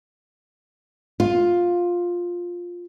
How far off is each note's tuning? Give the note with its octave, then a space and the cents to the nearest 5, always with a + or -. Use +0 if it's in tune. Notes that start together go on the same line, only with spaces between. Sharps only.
F4 +10